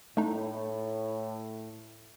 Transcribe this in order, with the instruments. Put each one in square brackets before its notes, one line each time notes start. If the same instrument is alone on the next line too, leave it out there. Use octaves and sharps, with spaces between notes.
[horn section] A2 [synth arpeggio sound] A3 D4 D#4